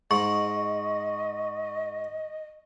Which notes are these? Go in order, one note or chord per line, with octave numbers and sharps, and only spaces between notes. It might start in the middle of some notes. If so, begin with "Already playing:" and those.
G#2 D#5 C#6